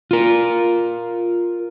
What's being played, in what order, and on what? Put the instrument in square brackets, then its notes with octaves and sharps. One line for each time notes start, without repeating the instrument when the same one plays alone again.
[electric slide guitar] F4 A#4